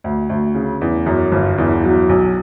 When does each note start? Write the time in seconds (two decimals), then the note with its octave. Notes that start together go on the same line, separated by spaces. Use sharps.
0.04 D2
0.30 D2
0.55 C#3
0.81 E2
1.06 F#2
1.32 G1
1.58 E2
1.83 F#3
2.09 B1